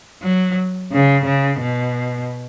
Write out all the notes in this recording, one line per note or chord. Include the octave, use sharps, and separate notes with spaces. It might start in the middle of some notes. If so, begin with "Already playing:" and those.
F#3
C#3
C#3
B2